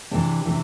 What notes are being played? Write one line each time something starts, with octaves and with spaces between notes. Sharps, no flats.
C3 E3 D4
C3 E3